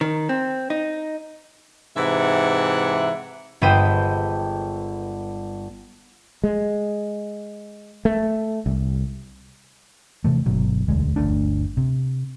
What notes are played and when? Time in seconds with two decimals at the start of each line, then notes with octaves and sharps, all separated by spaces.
0.01 D#3
0.29 C4
0.70 D#4
1.97 G#2 C3 E3 E5 F#5
3.62 G1 G#3 B4 C5 G5 D#7
6.44 G#3
8.05 A3
8.66 C2
10.24 C3 E3 A3
10.46 G1 B2 F#3
10.88 E1 D2 G#3
11.16 G1 D2 A3 D4
11.77 C3